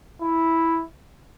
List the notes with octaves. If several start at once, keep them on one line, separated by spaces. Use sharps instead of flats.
E4